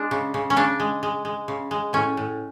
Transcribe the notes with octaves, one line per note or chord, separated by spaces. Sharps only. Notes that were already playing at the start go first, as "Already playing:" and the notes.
Already playing: G#3 D4
C#3
C#3
C#4
C#3 D4
G#3
G#3
G#3
C#3
G#3
A2 C#4
A2